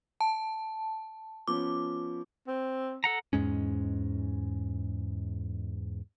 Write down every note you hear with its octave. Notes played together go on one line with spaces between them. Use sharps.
A5
F3 B3 C#4 D6
C4
A4 F#5 A#5
E2 G#2 G#3 C#4